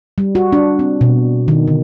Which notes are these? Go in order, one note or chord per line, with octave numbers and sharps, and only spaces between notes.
G3
F#4
D4
C4
B2
D#3
D3